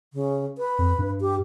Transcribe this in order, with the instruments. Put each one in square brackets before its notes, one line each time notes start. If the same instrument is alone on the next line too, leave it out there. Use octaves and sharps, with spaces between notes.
[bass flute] C#3
B4
[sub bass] F2
G2
[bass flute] G4